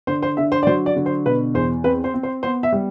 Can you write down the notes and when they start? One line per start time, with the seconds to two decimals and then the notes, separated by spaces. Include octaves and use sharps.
0.07 D3 C5
0.23 C5
0.37 D3 E5
0.52 C5
0.63 D5
0.67 F#3 C5
0.86 D5
0.96 D3
1.06 C5
1.25 B2 B4
1.54 E2 C5
1.84 C4 B4
2.04 C5
2.14 C4
2.23 C5
2.43 B3 C5
2.63 E5
2.72 G3